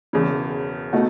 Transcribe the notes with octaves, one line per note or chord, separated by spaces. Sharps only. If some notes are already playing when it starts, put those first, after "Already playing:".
E1 E2 C#3
B2 A3 D#4 F#4